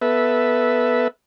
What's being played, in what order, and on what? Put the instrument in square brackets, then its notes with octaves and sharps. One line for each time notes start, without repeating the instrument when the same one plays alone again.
[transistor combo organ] B3 A4 B4 E5